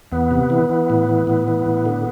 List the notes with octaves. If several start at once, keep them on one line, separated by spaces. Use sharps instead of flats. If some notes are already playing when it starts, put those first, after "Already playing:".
E2 B3
C3
E3
E3
A2
E3
A2 B3
E3
A2
D3